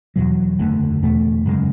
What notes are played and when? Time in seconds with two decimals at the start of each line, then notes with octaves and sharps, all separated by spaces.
0.16 E2 B2 F#3
0.59 F#1 E2 D3 A3
1.03 E2 B2 A3
1.46 F#2 C#3 G#3